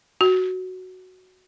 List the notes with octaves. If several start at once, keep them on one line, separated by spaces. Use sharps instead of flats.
F#4